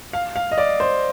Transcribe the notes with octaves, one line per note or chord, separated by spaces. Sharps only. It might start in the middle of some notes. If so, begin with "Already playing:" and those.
F5
F5
D#5
D5
C5